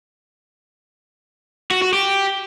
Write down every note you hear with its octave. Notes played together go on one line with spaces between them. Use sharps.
F#4
F#4
G4